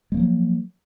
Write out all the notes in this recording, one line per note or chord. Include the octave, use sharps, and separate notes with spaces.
F3 F#3 G#3 A#3